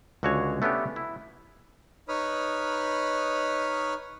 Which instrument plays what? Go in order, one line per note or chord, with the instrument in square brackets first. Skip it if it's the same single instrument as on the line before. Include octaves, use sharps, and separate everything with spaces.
[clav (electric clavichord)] C#2 D3 F#4 G#4 C#5
A3 B3 C#4 D4 G4
E4
[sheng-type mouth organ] D#4 B4 C#5 B5 D#6 F6